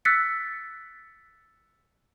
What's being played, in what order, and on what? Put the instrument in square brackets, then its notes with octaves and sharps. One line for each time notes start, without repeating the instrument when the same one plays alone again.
[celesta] E6 F#6 A6 B6 C#7